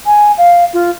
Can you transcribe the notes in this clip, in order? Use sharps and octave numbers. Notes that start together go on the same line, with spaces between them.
G#5
F5
F4